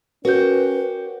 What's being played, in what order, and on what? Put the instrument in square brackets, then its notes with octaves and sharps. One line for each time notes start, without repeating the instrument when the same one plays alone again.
[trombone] C#4 [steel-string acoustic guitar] F#4 G4 [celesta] A#4 G6 [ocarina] B4